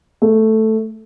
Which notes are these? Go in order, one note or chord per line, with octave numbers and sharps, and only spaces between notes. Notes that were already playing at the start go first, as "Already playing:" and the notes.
A3